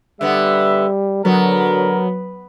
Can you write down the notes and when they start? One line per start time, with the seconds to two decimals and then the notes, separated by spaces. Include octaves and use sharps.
0.21 D3 G3 B3 E5
1.25 D3 F#3 B3 A#4